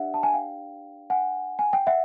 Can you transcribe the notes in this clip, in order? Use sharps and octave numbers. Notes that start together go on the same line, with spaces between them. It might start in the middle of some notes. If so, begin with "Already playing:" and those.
Already playing: D4 G4 B4 D5 E5 F#5
A5
G#5
F5 G5
F#5 G#5
G#5
G5
E5 F#5